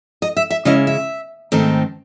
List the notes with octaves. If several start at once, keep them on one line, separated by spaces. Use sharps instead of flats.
D#5
E5
E5
C#3 G#3 C#4 E4 D#5
E5
G#2 D#3 A3 C4 D#4